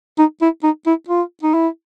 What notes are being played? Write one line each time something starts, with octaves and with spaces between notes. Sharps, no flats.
D#4
E4
D#4
E4
F4
D#4
E4